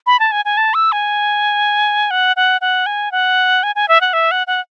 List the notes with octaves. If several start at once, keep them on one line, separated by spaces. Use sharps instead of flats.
B5
A5
G#5
G#5
A5
E6
G#5
F#5
F#5
F#5
G#5
F#5
G#5
G#5
E5
F#5
E5
F#5
F#5